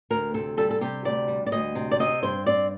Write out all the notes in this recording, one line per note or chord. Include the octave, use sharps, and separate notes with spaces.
D2 A#4
C3 A4
G3 A4
A4
C3 G4
D2 D5
G3
D5
D2 D#5
C3
D5
C4 D#5
G2 C5
C4 D5